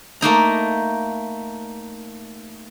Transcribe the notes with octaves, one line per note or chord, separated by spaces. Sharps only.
A3 A#3 D#4 A#5